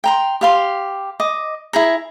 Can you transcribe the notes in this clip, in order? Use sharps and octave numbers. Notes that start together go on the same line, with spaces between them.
G5 A#5 C6
G4 F5 C6
D#5 D6
E4 G#4 A#5